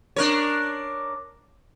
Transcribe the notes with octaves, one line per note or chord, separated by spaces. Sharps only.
D4 A#4 C#5